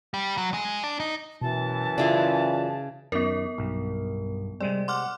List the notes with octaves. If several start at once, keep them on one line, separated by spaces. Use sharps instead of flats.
G3
F#3
G#3
D4
D#4
F#2 B2 E3 A5
C#3 E4 F4 G#4 D5 C6
F#2 D#3 B3 A#4 D5
B1 G2
C3 G3 G#3 C4 D5
F#5 C6 D6 F6